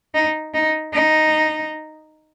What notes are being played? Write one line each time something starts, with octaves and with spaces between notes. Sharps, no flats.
D#4
D#4
D#4